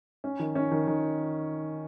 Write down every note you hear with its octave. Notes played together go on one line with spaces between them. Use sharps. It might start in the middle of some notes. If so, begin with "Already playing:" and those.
C#4
D#3
C#4
D#3
D#3